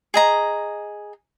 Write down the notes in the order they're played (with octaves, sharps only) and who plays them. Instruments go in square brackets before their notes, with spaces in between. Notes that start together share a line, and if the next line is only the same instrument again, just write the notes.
[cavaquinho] G#4 D#5 A#5